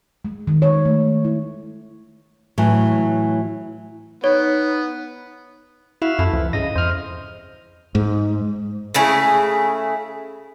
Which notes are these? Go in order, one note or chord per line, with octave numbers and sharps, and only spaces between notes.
G#3
D#3
C#5
A3
E4
A2 E3 F#3
B3 D#4 C#5
E4 F#4 E5 F5
F#2 E4 A4
C#2 E3 F3
G#2 C#3 D#5 A#6
F2 C5 F6
G#2
C#3 A3 E4 G#4